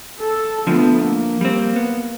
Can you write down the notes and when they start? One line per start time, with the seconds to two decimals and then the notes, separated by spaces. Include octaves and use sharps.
0.19 A4
0.67 F2 D3 F3 A3 B3
1.06 A#3
1.41 G3 C4
1.76 B3